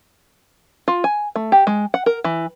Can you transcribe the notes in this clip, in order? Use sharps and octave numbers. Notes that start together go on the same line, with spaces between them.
F4
G#5
A3
G4
G#3
F#5
A#4
E3